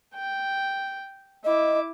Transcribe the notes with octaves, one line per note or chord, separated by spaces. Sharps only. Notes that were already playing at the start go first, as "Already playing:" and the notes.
G5
E4 D#5 D6